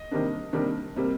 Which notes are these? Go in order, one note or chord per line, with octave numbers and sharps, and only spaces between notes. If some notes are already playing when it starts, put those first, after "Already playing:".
Already playing: D#5
C3 D#3 G3 A#3 D4
C3 D#3 G3 A#3 D4
C3 G3 A#3